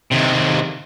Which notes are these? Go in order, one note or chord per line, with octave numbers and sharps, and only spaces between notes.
D#2 C3